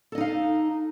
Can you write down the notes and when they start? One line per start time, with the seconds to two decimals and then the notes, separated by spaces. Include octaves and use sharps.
0.12 A4
0.15 D#5
0.18 D#4
0.21 F5